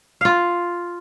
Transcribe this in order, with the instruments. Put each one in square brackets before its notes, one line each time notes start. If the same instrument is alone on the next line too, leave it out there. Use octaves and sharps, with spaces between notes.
[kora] F4 F5